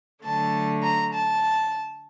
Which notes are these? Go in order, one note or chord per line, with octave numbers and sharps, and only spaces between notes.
D3 F#3 A3 A5
A#5
A5